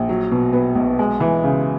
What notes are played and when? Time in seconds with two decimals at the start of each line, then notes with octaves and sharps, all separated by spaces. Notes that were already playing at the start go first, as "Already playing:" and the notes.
Already playing: A#1
0.09 F#3
0.32 B2
0.53 B3
0.75 B1
0.99 G#3
1.20 E3
1.44 C#3